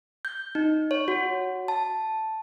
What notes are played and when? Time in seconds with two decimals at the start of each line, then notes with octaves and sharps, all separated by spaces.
0.25 G6
0.55 D#4
0.91 C#5
1.08 F#4
1.68 A5